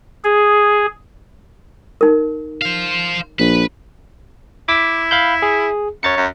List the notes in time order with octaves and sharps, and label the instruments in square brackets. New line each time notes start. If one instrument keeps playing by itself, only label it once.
[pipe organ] G#4
[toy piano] D#4 A#4
[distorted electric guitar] C5 F5
[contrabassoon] A#1 [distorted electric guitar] B4
[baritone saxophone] E4 [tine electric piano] D6 B6
[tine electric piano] F5 B5 G6
G#4
[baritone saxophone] F#2 [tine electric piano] C#5 A6 C#7
[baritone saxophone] F#2